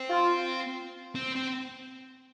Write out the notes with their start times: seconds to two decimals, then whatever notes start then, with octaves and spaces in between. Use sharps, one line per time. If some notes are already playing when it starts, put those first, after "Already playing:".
Already playing: C4
0.10 F4
1.15 C4
1.35 C4